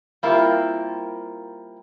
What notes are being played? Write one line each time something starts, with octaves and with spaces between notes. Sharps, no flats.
G3 A#3 C4 E4 F4 A#4